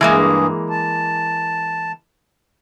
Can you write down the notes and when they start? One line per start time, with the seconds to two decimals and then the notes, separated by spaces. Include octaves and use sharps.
0.01 G2 E3 G#3 A#3 G#4
0.70 A5